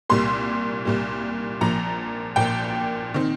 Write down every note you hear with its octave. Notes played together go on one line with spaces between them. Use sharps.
C2 A#2 G3 A#3 C6
C2 A#2 G3 A#3
A#1 A#2 F3 A#3 A#5
A#1 A#2 F3 A#3 G5
D#3 C4